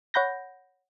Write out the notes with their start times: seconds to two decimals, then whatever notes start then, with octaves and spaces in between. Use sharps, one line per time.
0.14 C#5 F#5 B5 G6 A#6